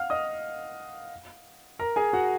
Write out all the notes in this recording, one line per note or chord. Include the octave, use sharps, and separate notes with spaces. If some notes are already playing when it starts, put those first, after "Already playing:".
Already playing: F5 F#5 F6
D#5 D#6
A#4 A#5
G#4 G#5
F#4 F#5